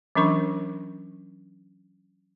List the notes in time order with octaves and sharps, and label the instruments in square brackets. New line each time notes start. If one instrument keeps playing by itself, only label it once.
[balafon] E3 F#3 C#4 D4 A#4 C#6